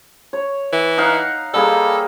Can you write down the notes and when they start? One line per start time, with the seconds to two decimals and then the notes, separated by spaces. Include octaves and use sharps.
0.33 C#5
0.73 E3
0.98 D#4 F5 F#5
1.54 G3 A#3 G#4 A4